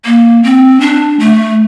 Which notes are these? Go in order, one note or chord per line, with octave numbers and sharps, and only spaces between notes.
A#3
C4
D4
A3